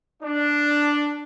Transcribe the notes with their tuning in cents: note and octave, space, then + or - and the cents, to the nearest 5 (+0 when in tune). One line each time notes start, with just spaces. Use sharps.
D4 +0 D5 +0